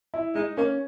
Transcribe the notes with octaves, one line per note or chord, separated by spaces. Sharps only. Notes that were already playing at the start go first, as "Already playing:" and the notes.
E4
G#3 D#4
A#3 C#4